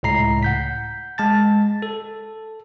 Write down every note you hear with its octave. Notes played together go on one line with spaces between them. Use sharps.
C#2 A2 A#5 C7
F#5 G6 B6
G#3 A5 A6
A4